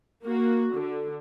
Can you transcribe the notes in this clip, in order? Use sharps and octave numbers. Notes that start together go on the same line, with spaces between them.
A#3 F#4
D3